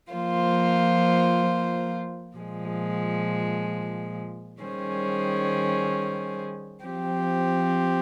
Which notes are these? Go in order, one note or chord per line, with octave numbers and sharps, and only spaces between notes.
F3 A#3 F4 C5
A#2 F3 G#3
D#3 G3 C#4 G#4 C5
F3 C4 G4